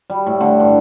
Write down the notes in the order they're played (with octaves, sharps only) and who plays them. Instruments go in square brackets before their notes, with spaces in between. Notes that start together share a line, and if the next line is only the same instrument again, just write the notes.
[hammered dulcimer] G3
A2
D3
G2